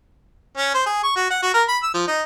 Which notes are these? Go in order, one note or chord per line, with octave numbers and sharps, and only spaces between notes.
C#4
C5
G#4
C#6
F#4
F#5
F#4
A#4
B5
E6
F3
D#4